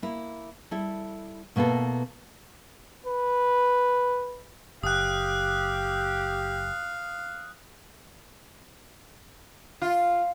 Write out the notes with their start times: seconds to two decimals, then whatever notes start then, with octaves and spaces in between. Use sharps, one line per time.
0.02 A#3 E4
0.71 G3 E4 A4
1.56 B2 A#3 B3 E4 A4
3.06 B4
4.83 F#1 G4 F5 D#6 F#6
9.82 F4